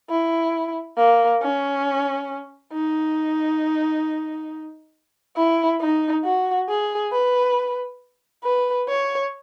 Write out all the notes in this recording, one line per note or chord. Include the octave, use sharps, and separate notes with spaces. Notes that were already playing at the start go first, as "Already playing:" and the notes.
E4
A#3
C#4
D#4
E4
D#4
F#4
G#4
B4
B4
C#5